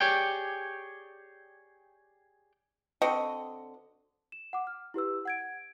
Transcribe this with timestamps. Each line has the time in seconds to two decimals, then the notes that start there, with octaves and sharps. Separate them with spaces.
0.01 G4 G#4 C#5 D5 G5
3.02 D3 C4 F#4 D#5
4.32 E7
4.53 F#5 D6
4.67 F6
4.94 E4 G4 B4 E6
5.25 F#5 G#6 D7